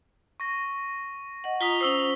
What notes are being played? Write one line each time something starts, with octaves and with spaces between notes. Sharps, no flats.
C#6 A#6
D#5 F#5
F4 A#5 D#6 B6 G7
C#4 C5 D#6 E6 G7